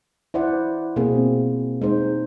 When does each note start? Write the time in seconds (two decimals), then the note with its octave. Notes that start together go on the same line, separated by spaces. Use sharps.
0.34 E4 C5 D5 F#5
0.96 B2 A#3 C4 G#4
1.82 G#3 D#4 C5